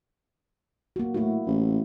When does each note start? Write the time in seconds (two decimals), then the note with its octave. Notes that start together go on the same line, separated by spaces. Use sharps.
0.96 A#3 F#4
1.14 A2 E4 F#4
1.46 A1